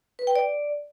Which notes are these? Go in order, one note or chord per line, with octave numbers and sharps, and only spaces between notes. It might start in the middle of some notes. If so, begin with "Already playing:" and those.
B4
G5
D5